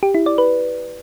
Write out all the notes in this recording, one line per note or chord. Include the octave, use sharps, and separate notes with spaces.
G4
E4
D5
B4